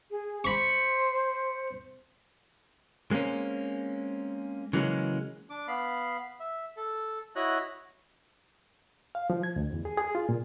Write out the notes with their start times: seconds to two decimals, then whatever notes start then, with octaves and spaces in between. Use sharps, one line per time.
0.11 G#4
0.44 C5 B5 C#6
3.11 G#3 A#3 C4 C#4
4.73 C#3 E3 F#3 G#3 A#3 C#4
5.50 D4 D6
5.68 B3 F5 B5
6.40 E5
6.77 A4
7.36 E4 F#4 C#5 D#5 F#6
9.15 F5
9.30 F3
9.43 G#6
9.56 D2
9.73 E2
9.85 G#4
9.97 G#4
10.15 F4
10.29 A#2